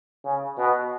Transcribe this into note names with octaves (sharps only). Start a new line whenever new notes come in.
C#3
B2